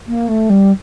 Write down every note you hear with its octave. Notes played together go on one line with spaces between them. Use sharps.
A#3
A3
G3